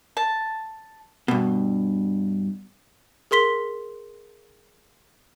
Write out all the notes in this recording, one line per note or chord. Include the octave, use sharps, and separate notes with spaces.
A5
G2 B2
G#4 A#4 C6 B6 G7